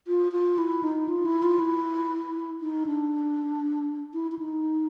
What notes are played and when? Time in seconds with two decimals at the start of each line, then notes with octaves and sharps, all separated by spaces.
0.07 F4
0.32 F4
0.58 E4
0.83 D#4
1.09 F4
1.26 E4
1.43 F4
1.59 E4
2.61 D#4
2.86 D4
4.14 E4
4.32 E4
4.39 D#4